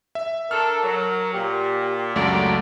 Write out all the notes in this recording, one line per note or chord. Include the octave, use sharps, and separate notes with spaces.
E5
D4 A4 A#4 F6
F#3
A#2 G4
C#2 F#2 A3 D4 F#4 G4 D5